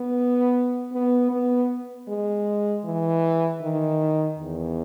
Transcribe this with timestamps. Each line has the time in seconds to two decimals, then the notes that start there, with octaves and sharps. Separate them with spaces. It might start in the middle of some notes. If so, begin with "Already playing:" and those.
Already playing: B3
0.93 B3
1.31 B3
2.08 G#3
2.85 E3
3.62 D#3
4.39 E2